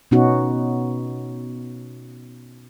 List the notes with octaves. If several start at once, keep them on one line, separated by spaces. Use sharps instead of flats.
B2 B3 C#4 D#4 F#4